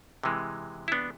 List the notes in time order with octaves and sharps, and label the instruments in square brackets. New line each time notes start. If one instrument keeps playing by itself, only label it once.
[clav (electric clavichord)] C3 E3 G#3
E4
B3 D4